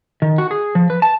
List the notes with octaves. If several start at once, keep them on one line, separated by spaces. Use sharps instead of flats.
D#3
F#4
G#4
F3
B4
A5